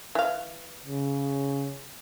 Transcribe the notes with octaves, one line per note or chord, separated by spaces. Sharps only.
E3 F5
C#3